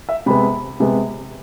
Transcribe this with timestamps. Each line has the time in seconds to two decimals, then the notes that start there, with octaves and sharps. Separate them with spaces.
0.09 E5
0.26 C3 G#3 B3 B5
0.80 C3 G#3 B3